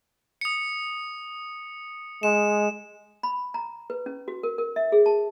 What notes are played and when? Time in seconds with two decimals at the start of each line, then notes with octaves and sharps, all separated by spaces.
0.41 D#6 C#7
2.23 G#3 E7
3.23 B5
3.54 A#5
3.90 B4
4.06 C#4
4.28 F#4
4.43 A#4
4.58 A#4
4.76 E5
4.92 G#4
5.06 A5